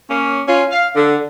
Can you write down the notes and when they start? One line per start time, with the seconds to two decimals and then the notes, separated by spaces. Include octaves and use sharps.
0.10 A#3 C#4
0.48 C#4 F4
0.72 F5
0.95 D3